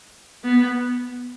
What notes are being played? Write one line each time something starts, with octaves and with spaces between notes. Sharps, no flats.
B3